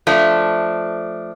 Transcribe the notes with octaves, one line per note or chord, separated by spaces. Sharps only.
F3 A3 D4